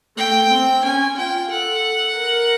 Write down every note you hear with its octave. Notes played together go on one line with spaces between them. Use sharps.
A3 G5
C4
C#4 G#5
F4 G5
A4 F#5
A#4